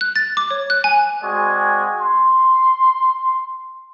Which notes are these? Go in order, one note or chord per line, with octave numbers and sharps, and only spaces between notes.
F#6
A6
D6
C#5
F#6
G#5
G#3 C4 F#4 D5 G#5
C6